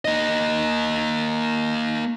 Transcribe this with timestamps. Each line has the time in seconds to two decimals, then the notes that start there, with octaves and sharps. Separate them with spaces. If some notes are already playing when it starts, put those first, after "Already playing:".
0.05 A#3 D#5